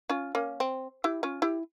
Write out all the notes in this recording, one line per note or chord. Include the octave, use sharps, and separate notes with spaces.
C#4 F4
A#3 C#4
C4
E4 G4
C#4 F4
E4 G4